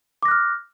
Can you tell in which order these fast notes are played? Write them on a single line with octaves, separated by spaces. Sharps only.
D6 A#6 F#6 F6